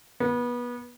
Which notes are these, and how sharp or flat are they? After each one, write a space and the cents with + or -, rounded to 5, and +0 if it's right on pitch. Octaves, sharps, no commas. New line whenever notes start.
B3 -25